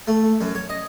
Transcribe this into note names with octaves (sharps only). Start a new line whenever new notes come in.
A3
F#2
C#5
D#5